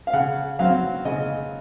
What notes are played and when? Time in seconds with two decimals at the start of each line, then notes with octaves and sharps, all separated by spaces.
0.07 F5
0.13 C#3 F#5
0.59 F#3 C4 F5
1.05 C#3 D#5